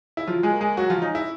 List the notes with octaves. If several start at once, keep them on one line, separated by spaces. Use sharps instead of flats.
E4
F3 F#3 F4
G#3 G#4
A#3
G#3 G#4
F#3 G#3 F#4
F3 F4
C#4 D#4
E4